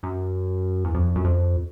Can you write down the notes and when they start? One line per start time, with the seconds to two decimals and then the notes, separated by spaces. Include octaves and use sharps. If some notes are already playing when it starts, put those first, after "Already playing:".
0.03 F#2
0.85 E2
0.95 F2
1.16 F#2
1.25 F2